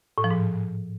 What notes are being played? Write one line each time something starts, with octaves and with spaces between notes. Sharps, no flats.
A2
F3
G#2